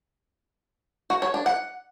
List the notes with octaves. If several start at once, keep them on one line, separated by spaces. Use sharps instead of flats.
F#4
C#5
D4
F#5